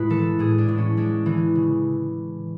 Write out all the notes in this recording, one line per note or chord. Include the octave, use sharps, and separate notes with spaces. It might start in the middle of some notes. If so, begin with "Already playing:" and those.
Already playing: A2 G#3 B4
E3 A4
A2 G#4
D4
A2
C#4
G#3 D4
E3
C#3